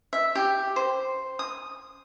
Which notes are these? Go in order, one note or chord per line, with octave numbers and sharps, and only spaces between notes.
E5
G4
C5
D#6